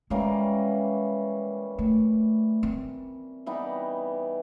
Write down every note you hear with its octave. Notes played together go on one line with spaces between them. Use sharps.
E3 G3 G#3 A#3 C#4
A3
C4
E3 G3 B3 D#4